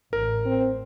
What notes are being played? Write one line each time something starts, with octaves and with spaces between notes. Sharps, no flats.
A1 A#4
C4